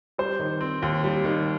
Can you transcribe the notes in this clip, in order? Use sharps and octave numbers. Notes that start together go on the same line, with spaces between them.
G3 C5
D#3
C4
D#2
G3
D#3